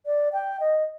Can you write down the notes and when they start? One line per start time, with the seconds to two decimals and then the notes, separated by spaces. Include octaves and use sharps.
0.06 D5
0.33 G5
0.60 D#5